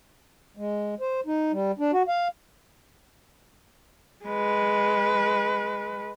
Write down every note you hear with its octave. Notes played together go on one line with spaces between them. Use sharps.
G#3
C5
D#4
G3
D4
F#4
F5
G#3 B4